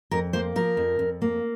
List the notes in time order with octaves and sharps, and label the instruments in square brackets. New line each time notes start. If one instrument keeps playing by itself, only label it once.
[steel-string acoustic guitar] F2 A#4
A#3 C5
F3 A#4
F2
F2
A#3